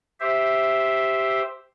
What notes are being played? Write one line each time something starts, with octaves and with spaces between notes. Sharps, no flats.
G4 C5 E5